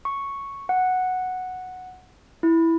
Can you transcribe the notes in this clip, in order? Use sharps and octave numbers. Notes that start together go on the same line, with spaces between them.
C#6
F#5
E4